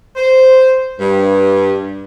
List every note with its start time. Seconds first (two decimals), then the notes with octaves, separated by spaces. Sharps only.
0.16 C5
0.99 G2